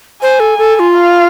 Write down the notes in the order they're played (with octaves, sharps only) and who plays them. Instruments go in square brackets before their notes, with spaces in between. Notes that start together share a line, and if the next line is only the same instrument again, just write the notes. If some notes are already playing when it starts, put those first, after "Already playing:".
[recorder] C5 [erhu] G#5
[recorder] A4
A4
A4
F4
[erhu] F5